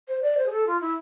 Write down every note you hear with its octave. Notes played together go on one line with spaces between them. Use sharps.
C5
D5
C5
G#4
A4
F4
E4